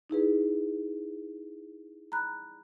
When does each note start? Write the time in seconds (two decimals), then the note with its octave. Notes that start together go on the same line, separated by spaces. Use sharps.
0.10 D#4 E4 G#4 B4
2.12 A#5 B5 F#6